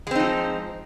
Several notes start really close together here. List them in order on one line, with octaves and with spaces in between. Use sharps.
G#3 C4 D#4 F3